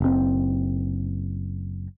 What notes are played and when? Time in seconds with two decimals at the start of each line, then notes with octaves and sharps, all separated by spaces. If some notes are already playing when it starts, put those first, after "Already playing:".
0.01 F#1 C4